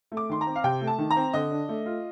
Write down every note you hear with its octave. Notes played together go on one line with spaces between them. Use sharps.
A3
D6
D#3 C6
A#5
C4
F5
C3 G5
A3
A5
D#3
A#5
C4
D3 D#5
D4
A3
F4